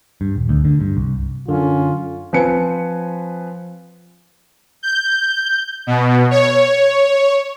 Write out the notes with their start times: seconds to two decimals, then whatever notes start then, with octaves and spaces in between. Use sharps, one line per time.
0.21 G2
0.36 D#1
0.49 D2
0.65 D3
0.81 G2
0.97 C2
1.49 F#2 D3 C#4 F4
2.33 F3 C4 B4 G#5 C#7
4.83 G6
5.87 B2
6.31 C#5